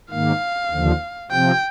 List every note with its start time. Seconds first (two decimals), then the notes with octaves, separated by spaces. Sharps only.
0.11 G#2 D#3 A#3 F5
0.71 D#2 D3 F3
1.31 C3 F3 C4 G5